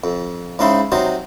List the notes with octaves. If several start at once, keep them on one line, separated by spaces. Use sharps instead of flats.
F2
G#2 C#3 D#4 E4 C6
C3 F#3 D#4 C5